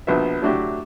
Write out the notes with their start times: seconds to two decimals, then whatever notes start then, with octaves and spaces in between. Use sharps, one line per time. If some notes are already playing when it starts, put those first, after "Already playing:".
0.07 A#1 B2 B3 E5
0.42 F#3 A3 D4 E4 F#4 G4